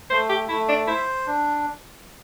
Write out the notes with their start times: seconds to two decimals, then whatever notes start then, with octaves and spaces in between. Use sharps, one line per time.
0.10 A3 C5
0.29 G4
0.49 A3 E4
0.69 D4
0.87 E4 C5
1.27 D4